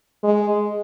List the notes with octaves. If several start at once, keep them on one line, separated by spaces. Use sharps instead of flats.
G#3